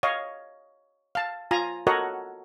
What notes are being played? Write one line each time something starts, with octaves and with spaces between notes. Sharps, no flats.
C#5 D#5 F5
F5 A5
F4 G#5 A#5
F#4 A4 A#4 C#5 D#5 F#5